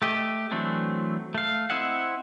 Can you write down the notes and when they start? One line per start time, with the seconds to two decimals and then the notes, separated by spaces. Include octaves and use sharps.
0.02 A3 G4 D#5
0.51 E3 F#3 A3 C4 D4
1.35 A3 F5
1.70 C4 E4 D#5 E5 F#5